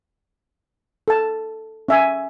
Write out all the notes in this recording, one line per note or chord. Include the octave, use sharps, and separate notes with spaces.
A4 A5
C#4 E5 G#5